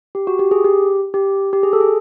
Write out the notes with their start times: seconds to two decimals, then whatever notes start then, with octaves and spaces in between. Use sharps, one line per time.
0.15 G4
0.27 F#4
0.39 G4
0.51 G#4
0.65 G4
1.14 G4
1.53 G4
1.63 G#4
1.73 A4
1.80 G#4